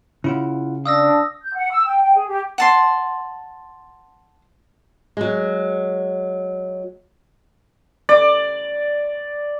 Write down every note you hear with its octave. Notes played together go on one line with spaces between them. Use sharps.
C#3 E4 F4 F#5
D4 F5 D#6 E6 A#6
G6
F#5
E6
G5
G5
G#4
G4
F#5 A5 C6
F#3 G#3
D5